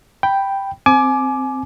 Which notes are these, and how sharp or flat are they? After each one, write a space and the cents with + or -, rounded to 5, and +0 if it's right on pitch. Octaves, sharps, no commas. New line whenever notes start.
G5 +0 B5 +0
C4 -5 G#5 +35 D6 +5